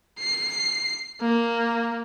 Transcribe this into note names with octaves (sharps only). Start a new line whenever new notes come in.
C7
A#3